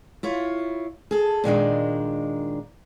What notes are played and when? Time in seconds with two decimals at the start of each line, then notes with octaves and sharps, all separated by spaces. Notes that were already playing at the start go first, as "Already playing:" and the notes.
0.23 E4 F4 C#5
1.11 G#4 A4
1.44 A#2 D#3 G#3 D4